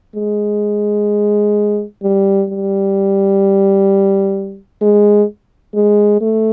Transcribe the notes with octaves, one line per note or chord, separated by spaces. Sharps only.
G#3
G3
G3
G#3
G#3
A3